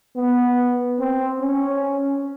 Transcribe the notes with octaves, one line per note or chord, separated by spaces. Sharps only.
B3
C4
C#4